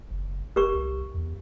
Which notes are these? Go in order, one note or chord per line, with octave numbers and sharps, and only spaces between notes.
F#1
F1 G4 A#4 C#6
C2
E2